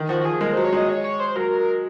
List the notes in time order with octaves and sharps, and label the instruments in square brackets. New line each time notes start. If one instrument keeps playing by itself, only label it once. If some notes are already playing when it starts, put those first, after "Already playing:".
Already playing: [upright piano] D#3
[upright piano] F3 [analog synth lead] F#4
[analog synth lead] F#4
[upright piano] F3 [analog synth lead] G#4
[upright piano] G#3 [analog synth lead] A#4
[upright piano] F#3 [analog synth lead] C5
[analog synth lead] C#5
[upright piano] G#3 [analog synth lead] D#5
[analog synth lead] C#5
C#5
C5
[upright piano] F#3 [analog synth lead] A#4